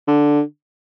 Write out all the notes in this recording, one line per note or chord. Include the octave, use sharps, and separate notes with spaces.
D3